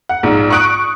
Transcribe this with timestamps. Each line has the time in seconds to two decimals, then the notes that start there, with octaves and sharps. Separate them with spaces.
0.09 F#5
0.23 A#1 G#2
0.50 C#6 D#6 F#6 D7